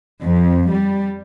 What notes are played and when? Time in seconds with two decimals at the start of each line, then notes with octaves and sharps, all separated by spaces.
0.23 F2
0.69 G3